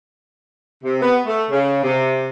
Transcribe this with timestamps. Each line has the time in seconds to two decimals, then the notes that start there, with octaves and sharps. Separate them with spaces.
0.84 C3
1.02 B3
1.26 A3
1.50 C#3
1.83 C3